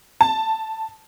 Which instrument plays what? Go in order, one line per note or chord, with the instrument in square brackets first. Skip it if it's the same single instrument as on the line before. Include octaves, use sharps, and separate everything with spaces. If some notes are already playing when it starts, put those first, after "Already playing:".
[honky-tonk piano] A5